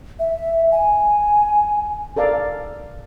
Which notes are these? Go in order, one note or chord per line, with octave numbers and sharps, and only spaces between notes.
E5
G#5
A4 A#4 D5 F5